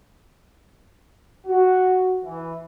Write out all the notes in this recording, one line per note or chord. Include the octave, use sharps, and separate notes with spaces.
F#4
E3